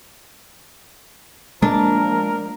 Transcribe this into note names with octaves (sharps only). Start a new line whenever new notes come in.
F3 G#3 A#3 D4 A#4